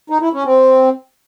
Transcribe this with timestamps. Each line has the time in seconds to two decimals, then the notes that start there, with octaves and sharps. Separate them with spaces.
0.10 D#4
0.22 E4
0.33 C#4
0.45 C4